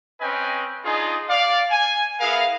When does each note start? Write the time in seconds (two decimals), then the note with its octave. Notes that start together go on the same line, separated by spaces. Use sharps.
0.20 C4 C#4 B4 D#5 G5 G#5
0.84 D4 D#4 F4 G#4
1.28 D5 F5
1.71 G#5
2.20 B3 E4 G#4 A#4 F5